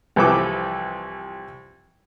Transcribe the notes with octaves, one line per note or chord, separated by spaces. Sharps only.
C2 E3 F3 A4 B4 D6